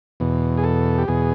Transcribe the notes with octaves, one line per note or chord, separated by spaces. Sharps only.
E2 B2
G#4
A4
G4
E2 B2 G#4